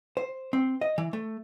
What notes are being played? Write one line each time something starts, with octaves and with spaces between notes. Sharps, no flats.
C5
C4
D#5
E3
A3